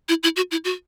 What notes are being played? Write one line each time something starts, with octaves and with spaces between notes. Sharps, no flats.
E4
E4
F#4
E4
F#4